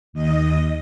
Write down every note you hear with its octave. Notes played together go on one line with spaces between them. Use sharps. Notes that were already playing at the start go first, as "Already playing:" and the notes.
D#2 D#5